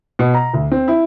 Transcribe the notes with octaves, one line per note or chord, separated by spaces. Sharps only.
B2
A#5
D2
C4
E4